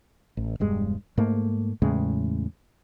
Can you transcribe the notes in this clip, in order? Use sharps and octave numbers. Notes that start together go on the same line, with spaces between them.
A1
E1 G2 G#3
G#2 A3 A#3
E2 A2 C#3 G#3